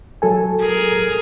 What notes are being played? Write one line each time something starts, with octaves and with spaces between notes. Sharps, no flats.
F#3 A4 G#5
G#4 A#4